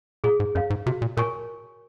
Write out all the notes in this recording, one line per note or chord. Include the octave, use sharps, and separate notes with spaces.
A#2 G#4
G#2
F#2 C#5 F5
G#2
C3 F#4
A#2
A#2 A#4 C#5 G#5 C#6